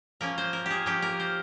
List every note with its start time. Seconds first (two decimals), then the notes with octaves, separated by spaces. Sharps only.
0.21 F3 A#3 C#4 A#4
0.38 C5
0.53 A#4
0.66 G4 G#4
0.86 F3 A#3 C#4 G4
1.02 A#4
1.20 C5